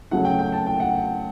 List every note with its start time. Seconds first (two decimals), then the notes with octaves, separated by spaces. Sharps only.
0.11 C#3 F#3 A3 F#5
0.25 G5
0.39 G5
0.52 A5
0.66 G5
0.80 F#5